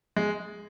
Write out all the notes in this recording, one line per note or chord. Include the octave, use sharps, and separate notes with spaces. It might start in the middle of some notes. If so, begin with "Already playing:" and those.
G#3